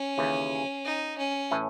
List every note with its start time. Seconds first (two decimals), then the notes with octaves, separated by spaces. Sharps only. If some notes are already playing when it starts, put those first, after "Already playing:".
Already playing: C#4
0.18 D#2 C#3 E3
0.85 D#4
1.18 C#4
1.51 A2 E3 A3 E4